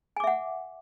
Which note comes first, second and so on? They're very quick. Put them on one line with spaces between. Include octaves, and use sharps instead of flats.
G#5 D6 E5 F#5